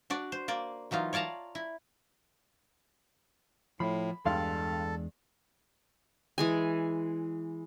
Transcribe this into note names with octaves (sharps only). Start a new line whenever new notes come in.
D4 F#4 D5
C5
A#3 D5
E3 F#3 D#4 F4
C#5 D5 F5 A5 A#5
E4
A2 F3 B5
E2 G2 G#3 D4 A4 F5 C6
E3 G#3 G#5